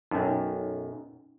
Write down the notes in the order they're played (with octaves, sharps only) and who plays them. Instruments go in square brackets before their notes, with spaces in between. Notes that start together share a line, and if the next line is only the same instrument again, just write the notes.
[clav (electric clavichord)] B1 F#2 [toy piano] C#4 D#4